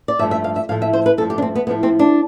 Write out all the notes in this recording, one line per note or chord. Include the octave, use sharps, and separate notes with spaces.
D5
G2 F3 A3 E5
E5
F5
E5
A2 F3 A3 F5
E5
C5
B4
G2 F3 A3 A4
G4
D4
C4
B3
A2 F3 A3 B3
C4
D4